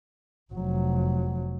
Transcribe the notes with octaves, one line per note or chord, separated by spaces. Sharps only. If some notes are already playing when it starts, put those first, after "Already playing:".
F1 F#3